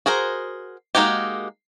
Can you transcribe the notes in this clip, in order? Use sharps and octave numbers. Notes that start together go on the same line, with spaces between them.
F#4 G#4 A#4 C5
G#3 A#3 D#4 F#4 G4